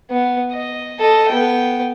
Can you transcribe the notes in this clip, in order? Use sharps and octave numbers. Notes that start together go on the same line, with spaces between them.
B3
D#5
A4 D#5
B3 G5